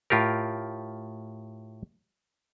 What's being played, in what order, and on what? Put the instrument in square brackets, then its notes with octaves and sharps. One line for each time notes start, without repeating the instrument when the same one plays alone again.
[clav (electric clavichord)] A2 F4 G4 A#4